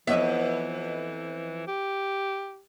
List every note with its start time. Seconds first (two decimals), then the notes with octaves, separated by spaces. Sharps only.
0.07 F2 E3 B3 E4 C#5 D#5 E5
1.67 G4